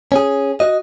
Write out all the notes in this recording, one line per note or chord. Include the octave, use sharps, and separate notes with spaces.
C#4 G#4
F#4 D#5